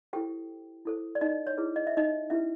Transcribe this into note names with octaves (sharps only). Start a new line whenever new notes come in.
E4 G4 A4 C5 G5
E4 A4 C5
D5
D#4 D#5
C#5
E4 G#4 B4
D#5
E5
D#4 D#5
C#4 E4 G4 B4 E5